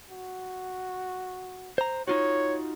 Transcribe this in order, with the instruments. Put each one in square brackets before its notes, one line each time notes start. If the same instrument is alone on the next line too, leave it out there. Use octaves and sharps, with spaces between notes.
[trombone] F#4
[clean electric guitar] C5 A#5
[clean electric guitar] D#4 F4 F#4 [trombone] C#5